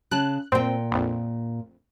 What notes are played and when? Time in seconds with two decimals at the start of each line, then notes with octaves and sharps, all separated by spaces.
0.11 C#3 A5 F#6
0.52 A#2 C4 G5
0.92 A#1 F2